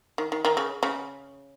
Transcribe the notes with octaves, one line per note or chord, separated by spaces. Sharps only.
D#3
D#3
D#3
C#3
C#3